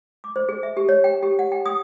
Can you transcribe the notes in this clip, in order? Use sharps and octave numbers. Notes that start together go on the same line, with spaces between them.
D6
C5
G#4
E5
G4
C#5
G5
G4
F#5
G5
D#6